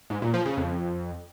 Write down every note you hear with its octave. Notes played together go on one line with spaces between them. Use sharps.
G#2
A#2
F3
C#3
F2